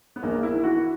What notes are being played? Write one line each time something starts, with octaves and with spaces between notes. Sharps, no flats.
B3
A#1 A#3
E4
E3
F#4